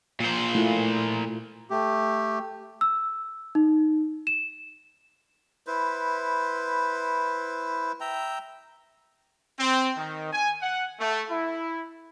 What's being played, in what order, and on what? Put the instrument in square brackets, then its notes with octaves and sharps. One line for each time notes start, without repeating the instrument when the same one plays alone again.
[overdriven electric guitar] A#2 C5
[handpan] A3 E4 F4
[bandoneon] A3 G4
[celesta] E6
D#4
E7
[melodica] E4 B4 C5
E5 G5 A#5
[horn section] C4
D#3
G#5
F#5
A3
E4